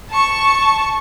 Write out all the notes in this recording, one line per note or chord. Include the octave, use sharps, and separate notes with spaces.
A5 C#6